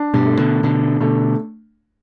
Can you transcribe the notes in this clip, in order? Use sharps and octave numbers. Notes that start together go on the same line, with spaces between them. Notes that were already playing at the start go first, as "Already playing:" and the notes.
Already playing: D4
G2 B2
A3
B2 D3
B2 D3 D4
B2 D3 A3